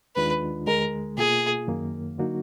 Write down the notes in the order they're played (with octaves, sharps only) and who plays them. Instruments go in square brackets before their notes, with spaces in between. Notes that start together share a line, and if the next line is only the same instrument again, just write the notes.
[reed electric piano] D#2 D#3 G#3 D4 F4 [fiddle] B4
[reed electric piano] D2 D3 G#3 [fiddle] A#4
[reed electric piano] B2 A#3 F4 [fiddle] G#4
[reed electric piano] F#2 D#3 A#3
D3 F#3 A#3 D#4 F#4